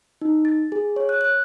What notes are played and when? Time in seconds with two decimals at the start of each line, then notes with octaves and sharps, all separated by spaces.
0.22 D#4
0.45 A6
0.72 G#4
0.96 C#5
1.09 F#6
1.21 F#6